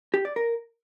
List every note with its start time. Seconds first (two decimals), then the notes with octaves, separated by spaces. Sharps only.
0.14 G4
0.25 D5
0.36 A#4